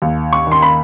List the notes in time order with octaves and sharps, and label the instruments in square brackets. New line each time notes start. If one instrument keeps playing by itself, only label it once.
[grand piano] D#2
[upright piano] C#6
[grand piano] D#3 [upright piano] C6
[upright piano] B5